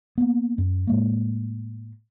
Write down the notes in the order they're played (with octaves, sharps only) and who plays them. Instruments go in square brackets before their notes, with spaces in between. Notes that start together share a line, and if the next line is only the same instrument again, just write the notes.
[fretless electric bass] A#3 B3
F#2
A2 G#3 A#3